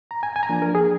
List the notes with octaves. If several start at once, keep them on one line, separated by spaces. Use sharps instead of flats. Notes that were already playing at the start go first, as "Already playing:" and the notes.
A#5
G#5
G#5
A#5
F3 A#3 D4 G#5
A#4
G#4